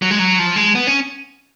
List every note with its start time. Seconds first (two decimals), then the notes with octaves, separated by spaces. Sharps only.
0.02 F#3
0.11 G#3
0.19 F#3
0.39 F3
0.56 G#3
0.75 B3
0.87 C#4